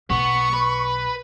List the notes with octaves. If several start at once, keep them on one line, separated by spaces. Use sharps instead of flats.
B1 B3 C#6
B4